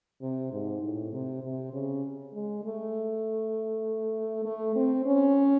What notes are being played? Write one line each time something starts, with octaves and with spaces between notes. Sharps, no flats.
C3
G#2
A2
C3
C3
C#3
G#3
A3
A3
C4
C#4